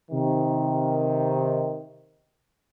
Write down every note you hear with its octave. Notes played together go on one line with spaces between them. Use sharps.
C3 D#3